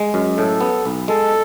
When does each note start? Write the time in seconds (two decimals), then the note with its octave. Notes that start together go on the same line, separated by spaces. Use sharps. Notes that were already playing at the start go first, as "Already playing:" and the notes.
Already playing: G#3
0.14 F#2
0.37 A2 A4
0.61 B3
0.85 B1
1.08 G#3 A4